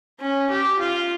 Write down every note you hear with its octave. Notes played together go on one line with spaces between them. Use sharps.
C#4
G4
F4